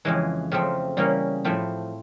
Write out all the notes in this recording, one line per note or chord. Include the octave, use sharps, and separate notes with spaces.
F2 C#3 E3 G#3
F2 C#3 F3 A3 C4
C#3 E3 G3 A#3 C#4
A2 F3 A3 C4